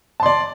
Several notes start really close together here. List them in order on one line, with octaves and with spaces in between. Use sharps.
A5 C6 D5